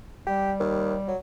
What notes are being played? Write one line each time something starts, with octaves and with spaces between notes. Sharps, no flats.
G3 G4
D#2
F#3